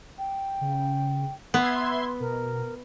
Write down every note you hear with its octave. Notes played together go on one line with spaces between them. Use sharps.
G5
C#3
B3 B4 E5 C6 G#6
B2 A#4